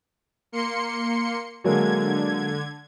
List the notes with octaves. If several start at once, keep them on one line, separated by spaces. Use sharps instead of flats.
A#3 C6 C#7
D3 F#3 G#3 A#3 G#6